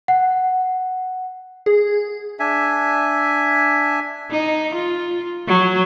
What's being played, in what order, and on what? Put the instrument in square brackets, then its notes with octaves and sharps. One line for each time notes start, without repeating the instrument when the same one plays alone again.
[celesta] F#5
[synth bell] G#4
[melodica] D4 E5 G#5
[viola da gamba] D#4
F4
F#3